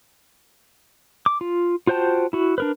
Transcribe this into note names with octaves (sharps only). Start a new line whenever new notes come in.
D6
F4
F4 F#4 C5 G5 A5
E4 F#4
D4 A#4 B4